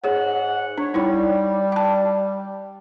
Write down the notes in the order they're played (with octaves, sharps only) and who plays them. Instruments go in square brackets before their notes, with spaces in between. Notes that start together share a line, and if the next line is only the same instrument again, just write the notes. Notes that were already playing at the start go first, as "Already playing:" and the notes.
[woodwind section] G#2 F#5 [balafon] G#4 C#5
[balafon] D4 [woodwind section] C#5
[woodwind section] G3 [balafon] D#4 E4 C#5
[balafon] G5 A5